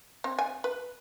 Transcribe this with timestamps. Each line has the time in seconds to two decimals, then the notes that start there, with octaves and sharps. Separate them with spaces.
0.24 C4
0.39 G#5
0.64 B4